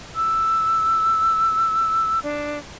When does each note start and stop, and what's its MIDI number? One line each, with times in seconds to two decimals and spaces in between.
0.16 2.19 88
2.23 2.58 62